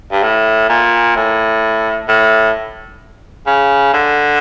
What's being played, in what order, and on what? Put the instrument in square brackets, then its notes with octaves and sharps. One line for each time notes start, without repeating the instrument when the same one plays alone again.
[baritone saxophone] G2
A2
A#2
A2
A2
C#3
D3